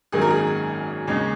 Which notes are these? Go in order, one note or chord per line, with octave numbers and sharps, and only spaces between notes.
G#1 F#2 D#3 F#3 A#3 G#4
A#4
G#4
D#2 C#3 G#3 C#4